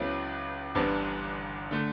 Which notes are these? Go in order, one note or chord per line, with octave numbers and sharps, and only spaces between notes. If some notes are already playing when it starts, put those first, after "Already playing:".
Already playing: C#2 C#3 F#3 B3 E4
G1 G2 E3 B3 D4
D3 A3